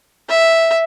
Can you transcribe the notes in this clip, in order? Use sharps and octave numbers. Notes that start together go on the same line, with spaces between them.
E5